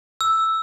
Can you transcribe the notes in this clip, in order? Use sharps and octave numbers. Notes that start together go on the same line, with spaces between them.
E6